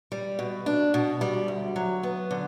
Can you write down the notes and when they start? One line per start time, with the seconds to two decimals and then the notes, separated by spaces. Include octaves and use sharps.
0.12 G3
0.39 B2
0.66 D4
0.94 B2
1.21 G3
1.48 D2
1.76 F#3
2.03 B3
2.31 D3